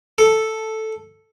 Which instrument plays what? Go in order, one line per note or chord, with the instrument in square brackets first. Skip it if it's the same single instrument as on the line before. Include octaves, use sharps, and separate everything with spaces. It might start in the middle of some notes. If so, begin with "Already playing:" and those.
[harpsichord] A4